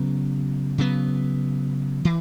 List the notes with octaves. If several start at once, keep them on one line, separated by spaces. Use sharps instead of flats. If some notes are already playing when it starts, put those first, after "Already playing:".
Already playing: C#3 F#3 B3
C#3 F#3 B3
E3